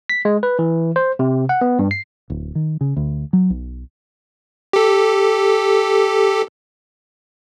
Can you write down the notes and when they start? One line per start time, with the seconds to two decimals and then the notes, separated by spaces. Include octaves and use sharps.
0.09 B6
0.25 G#3
0.43 B4
0.59 E3
0.96 C5
1.19 C3
1.49 F#5
1.61 B3
1.79 G2
1.91 C7
2.30 D1
2.55 D#3
2.81 C#3
2.97 D2
3.33 F#3
3.50 B1
4.73 G4 A4